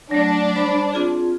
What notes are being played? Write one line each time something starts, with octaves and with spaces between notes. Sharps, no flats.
F#3 A3 D4
G3 C5 B5
C4 F4 G#4